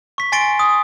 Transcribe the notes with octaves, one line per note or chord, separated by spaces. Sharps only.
C#6 B6
G#5 C6 A6 C7 D7 G7
D#6